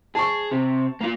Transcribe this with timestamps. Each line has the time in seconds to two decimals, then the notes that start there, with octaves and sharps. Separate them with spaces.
0.15 G#4 A5 C#6
0.51 C3
1.01 A#3 F4